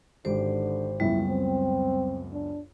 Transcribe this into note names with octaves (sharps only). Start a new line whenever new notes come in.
G#1 D3 G4 C5
C#2 F#2 G3 B3 E4
C4
D4